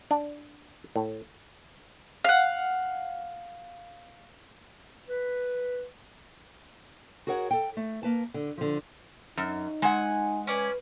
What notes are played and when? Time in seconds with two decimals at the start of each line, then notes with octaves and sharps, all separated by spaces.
0.11 D4
0.96 A2
2.24 F5 F#5
5.09 B4
7.27 F#4 G#4 A#4 C#5 F#5
7.51 A4 G5
7.77 A3
8.03 A#3 B4 A5
8.34 D3
8.58 D3 F3
9.37 F#2 D#4
9.82 G#3 F#5 G#5
10.47 C#4 B4 D5 G#5